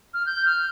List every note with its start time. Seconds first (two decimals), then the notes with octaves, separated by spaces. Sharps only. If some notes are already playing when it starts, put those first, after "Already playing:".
0.14 F6
0.26 G6
0.45 F6